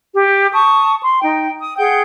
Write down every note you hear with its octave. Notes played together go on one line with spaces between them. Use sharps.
G4
A5 C#6 D#6
C6
D#4 G5
D#6
G#4 F#5 G5 G6